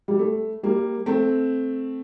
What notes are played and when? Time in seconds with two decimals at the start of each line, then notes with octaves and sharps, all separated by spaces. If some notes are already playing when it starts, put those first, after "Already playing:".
0.08 G3
0.19 A3
0.63 G3 A#3
1.06 A3 C4